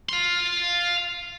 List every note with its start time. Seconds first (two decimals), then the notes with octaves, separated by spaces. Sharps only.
0.09 F5 C6